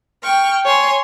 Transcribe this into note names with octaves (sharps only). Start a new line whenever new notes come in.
G5 C#6 F6
C#5 G#5 C6